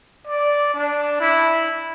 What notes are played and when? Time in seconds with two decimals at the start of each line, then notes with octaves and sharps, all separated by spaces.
0.27 D5
0.74 D4
1.21 E4